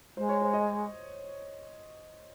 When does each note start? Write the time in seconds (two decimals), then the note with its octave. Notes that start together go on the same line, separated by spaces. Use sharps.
0.17 G#3 C5
0.29 C#5
0.42 C5
0.53 D#5